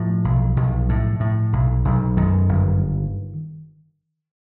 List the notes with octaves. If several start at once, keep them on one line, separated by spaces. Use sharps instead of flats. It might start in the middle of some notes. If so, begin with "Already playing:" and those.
Already playing: A2 F3
B1
B1
A2
A2
B1
B1
F#2 D#3
G1